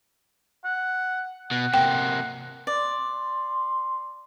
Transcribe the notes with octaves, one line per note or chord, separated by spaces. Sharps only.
F#5
B2 F#5
C3 A#3 G5
D5 C6